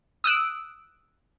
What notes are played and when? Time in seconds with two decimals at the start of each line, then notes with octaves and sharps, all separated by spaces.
0.24 D#6 E6 F#6 D7